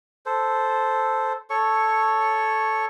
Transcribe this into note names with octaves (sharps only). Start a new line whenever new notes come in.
A4 C5
A4 C#5 C#6